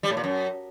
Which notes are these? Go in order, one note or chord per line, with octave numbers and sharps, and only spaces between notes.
G3
A2
A#2
F#2